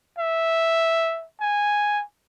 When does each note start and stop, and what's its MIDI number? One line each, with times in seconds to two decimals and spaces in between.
0.19 1.25 76
1.41 2.03 80